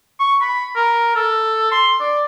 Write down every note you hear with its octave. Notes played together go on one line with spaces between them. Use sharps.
C#6
B5
A#4
A4
C6
D5